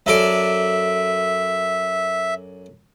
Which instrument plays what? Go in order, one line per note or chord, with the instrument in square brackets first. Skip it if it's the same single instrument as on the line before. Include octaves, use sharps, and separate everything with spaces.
[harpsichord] F#2 A4 D5 [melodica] E5